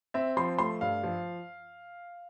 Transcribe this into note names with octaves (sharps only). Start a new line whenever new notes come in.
C4 E5
F3 C6
A3 C6
G2 F5
F3